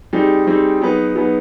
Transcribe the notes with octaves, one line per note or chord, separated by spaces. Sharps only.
G3 C4 D#4 G#4
G3 C4 D#4 G#4
F#3 B3 D#4 G#4 B4
F#3 B3 D#4 G#4 B4